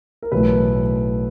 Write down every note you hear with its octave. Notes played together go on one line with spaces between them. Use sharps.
A#4
B1 A2 E3 A3 B4